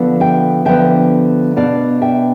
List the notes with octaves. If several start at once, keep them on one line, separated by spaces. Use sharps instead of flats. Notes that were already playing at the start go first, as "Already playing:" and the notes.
Already playing: D3 F3 B3
E5 G5
D3 F3 B3 E5 G5
B2 B3 D4 D5 F5
E5 G5